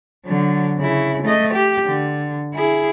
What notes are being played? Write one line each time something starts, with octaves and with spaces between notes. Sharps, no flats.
D3 F#3
C#3 E4
A3 D#5
G4
D3
E4 G#4